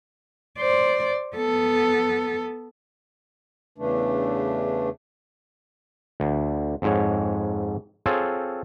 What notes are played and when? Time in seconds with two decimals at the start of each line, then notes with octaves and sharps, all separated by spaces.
0.59 C5 D5
1.36 B3 A4
3.78 E2 C#3 E3 A3 D4
6.20 D2
6.82 F2 G#2 C#5
8.06 C4 F4 G#4 A4 C#5